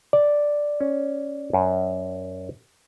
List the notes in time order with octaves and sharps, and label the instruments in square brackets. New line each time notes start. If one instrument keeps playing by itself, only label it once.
[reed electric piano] D5
[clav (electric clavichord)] C#4
F#2